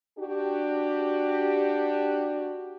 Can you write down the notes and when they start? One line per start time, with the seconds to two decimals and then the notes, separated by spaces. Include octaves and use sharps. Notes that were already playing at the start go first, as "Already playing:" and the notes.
0.19 D4 F#4 G4